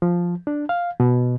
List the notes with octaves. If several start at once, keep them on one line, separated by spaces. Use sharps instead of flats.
F3
D4
F5
B2